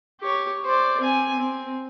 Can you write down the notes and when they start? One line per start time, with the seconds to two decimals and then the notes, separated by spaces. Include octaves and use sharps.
0.20 G4 C#5
0.65 C5 D5
1.01 C4 G#5
1.39 C4